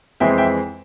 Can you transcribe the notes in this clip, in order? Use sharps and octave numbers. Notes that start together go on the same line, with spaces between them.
F2 E3 G#3 C4 E5 G5
E5 G5